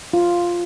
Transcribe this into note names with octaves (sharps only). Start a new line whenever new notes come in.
F4